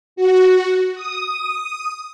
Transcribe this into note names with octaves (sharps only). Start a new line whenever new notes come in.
F#4
D#6